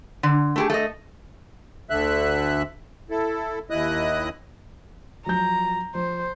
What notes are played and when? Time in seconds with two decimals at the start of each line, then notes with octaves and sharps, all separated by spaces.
0.23 D3
0.56 A3 G4 G#4
0.70 A3 D#5
1.90 D2 D3 E5 F#6
3.10 E4 A4
3.70 D#2 E4 D#5 D#6 F#6
5.26 F3 F#3 A#5 G6
5.95 F3 C5